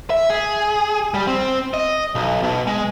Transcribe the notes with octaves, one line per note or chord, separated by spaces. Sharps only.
E5
G#4
G3
C4
D#5
B1
B2
G#3